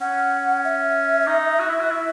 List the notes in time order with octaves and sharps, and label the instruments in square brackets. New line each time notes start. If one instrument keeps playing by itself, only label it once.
[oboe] C#4 [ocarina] F#5
[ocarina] E5
[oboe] D#4
F#4
E4
F#4
E4